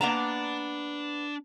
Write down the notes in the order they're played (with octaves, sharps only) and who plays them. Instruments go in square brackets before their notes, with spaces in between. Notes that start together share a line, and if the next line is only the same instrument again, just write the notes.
[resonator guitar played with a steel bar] A#3 B3 A#5 [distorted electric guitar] D4